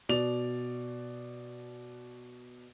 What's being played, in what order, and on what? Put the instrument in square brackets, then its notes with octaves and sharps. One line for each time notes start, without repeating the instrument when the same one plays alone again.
[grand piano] B2 D5 F7